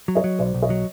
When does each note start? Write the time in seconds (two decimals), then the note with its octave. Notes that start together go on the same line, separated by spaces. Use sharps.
0.08 F#3
0.15 C#5 D#5
0.24 F#3
0.39 B1 C5 D5
0.54 B1
0.63 C#5 D#5
0.70 F#3